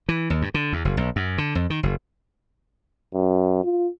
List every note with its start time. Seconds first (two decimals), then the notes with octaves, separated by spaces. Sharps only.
0.09 E3
0.30 D#2
0.42 G2
0.54 D3
0.73 E2
0.85 F#1
0.97 B1
1.16 F#2
1.38 D3
1.55 F2
1.70 D#3
1.83 F#1
3.14 F#2
3.64 F4